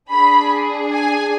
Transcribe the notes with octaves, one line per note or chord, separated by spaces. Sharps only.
D4 G#4 B5
G#5